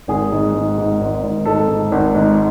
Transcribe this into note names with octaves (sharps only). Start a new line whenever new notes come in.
G#1 G#4
G#2
G#2
G#2
G#1
G#1
G#2 A4
G#2
G#1
G#2